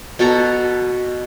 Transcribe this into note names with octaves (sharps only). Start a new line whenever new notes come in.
B2 F#4 A4 A#5